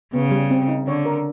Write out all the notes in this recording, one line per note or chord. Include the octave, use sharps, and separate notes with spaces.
C#3 B3
G3
C4
D#4
D3 C#5
A#4